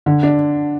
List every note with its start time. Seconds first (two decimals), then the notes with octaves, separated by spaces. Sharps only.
0.06 D3
0.23 D4